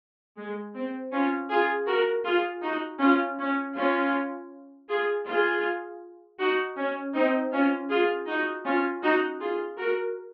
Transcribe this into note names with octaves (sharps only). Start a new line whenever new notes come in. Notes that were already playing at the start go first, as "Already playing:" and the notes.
G#3
C4
C#4 F4
F4 G#4
F#4 A#4
F4 G#4
D#4 F#4
C#4 F4
C#4
C#4 F4
F4 G#4
F4 G#4
D#4 F#4
C#4
C4 D#4
C#4 F4
F4 G#4
D#4 F#4
C#4 F4
D#4 F#4
F4 G#4
F#4 A#4